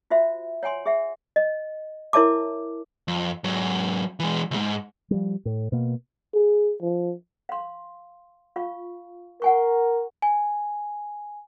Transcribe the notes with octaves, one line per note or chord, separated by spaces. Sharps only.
F4 F#4 C5 E5
C#5 F#5 G#5 C6
G#4 E5 F#5
D#5
E4 A#4 C#5 E5 A5 D6
F2
G#2 F#3
E3 G#3
C#2 G#2
F3 G3
A2
B2 A#3
G#4
F3
F5 C6
F4 F5 C#6
A#4 F#5 G#5 C#6
G#5